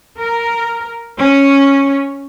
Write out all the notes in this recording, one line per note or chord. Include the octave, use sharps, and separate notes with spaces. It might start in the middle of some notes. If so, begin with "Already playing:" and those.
A#4
C#4